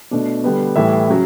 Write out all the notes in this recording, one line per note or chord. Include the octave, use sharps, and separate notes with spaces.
B2 A3 D4
D3 G3 B3
A2 E3 G3 E5
C#3 F#3